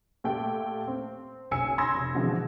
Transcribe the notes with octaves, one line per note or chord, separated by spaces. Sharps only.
A#2 A3 G4 A4 G5
C4
F#1 B1 G#5 E6 C#7
B5 C6 D#6 E6 G#6 A#6
F1
B2 D3 E3 F3 G#3 C4